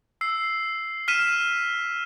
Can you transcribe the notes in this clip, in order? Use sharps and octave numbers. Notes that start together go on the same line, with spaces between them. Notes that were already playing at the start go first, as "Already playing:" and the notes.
E6 C7
F6 B6 D#7 E7